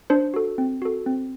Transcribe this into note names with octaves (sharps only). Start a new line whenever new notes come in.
D4 C5
F#4 A4
C4
F#4 A4
C4